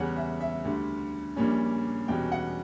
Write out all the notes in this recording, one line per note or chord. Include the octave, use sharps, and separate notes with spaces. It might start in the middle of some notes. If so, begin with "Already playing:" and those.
Already playing: E2 C#3 G3 C#4 F#5
E5
E5
D2 D3 G3
A#1 A#2 G3 A#3 C#4
E2 B2 G3 C#4 G5
F#5